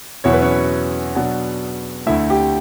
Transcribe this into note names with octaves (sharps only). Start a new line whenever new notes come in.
E2 B2 F#3 B3 E4 C#5
B4
C#4 C#5
B2 F#3 B3 D4
D2 D3 A3 E4 E5
G4 G5